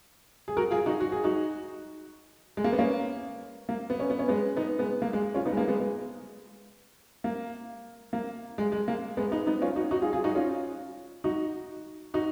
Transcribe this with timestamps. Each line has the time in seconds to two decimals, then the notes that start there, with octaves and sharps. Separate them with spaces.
0.48 G#4
0.57 F#4 A#4
0.71 F4 G#4
0.86 D#4 F#4
1.00 F#4
1.12 G#4
1.24 D#4 F#4
2.57 G#3
2.64 A#3
2.73 B3
2.78 A#3 C#4
3.69 A#3
3.90 B3
4.00 C#4
4.10 B3
4.19 C#4
4.28 G#3 B3
4.56 B3 D#4
4.79 G#3 B3
5.02 A#3
5.13 G#3
5.35 C#4 F4
5.46 B3 D#4
5.53 G#3
5.57 A#3
5.68 G#3 B3
5.80 G#3
7.24 A#3
8.13 A#3
8.58 G#3
8.72 G#3
8.88 A#3
9.17 G#3 B3
9.32 B3 D#4
9.47 B3 D#4
9.62 C#4 F4
9.76 D#4 F#4
9.91 D#4 F#4
10.02 F4 G#4
10.13 F4 G#4
10.24 D#4 F#4
10.35 C#4 F4
11.24 D#4 F#4
12.14 D#4 F#4